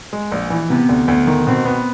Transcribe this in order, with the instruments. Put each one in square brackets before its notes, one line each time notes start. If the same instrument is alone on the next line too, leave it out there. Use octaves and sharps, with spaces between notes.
[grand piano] G#3
A#1
E3
[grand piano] C3 [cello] B3
[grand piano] D2
[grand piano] D2 [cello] B3
[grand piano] D#3
[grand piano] B2 [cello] C4
[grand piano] B3